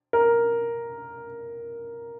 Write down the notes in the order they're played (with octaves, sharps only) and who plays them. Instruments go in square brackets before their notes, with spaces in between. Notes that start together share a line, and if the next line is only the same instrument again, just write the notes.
[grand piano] A#4